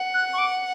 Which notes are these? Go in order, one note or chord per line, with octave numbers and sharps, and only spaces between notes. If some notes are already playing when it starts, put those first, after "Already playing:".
Already playing: F#5
F#6
C#6
D6